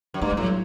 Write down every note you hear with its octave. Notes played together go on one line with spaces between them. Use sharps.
F#2
G2 A3
G3
A2 F#3